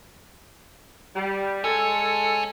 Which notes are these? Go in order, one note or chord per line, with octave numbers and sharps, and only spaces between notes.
G3
G#3 A4 C#5 G#5